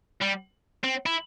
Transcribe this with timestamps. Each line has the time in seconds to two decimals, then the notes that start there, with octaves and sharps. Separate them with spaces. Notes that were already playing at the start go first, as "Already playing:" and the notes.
0.22 G3
0.84 C4
1.06 E4